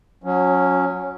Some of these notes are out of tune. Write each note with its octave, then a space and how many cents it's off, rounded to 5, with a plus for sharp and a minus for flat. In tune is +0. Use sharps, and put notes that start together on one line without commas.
F#3 -25 C#4 +0